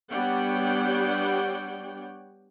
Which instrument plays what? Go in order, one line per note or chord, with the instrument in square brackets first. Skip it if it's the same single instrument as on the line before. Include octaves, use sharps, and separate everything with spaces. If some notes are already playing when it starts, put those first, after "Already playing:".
[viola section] G3 B3 D4 C#5 F#5 G5